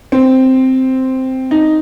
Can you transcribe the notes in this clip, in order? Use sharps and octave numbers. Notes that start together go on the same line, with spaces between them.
C4
D#4